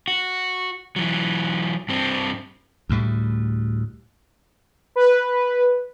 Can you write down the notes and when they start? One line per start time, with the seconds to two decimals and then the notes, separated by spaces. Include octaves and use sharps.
0.08 F#4
0.96 E3 F#3
1.89 G2 C4
2.89 D2 A2 G3
4.96 B4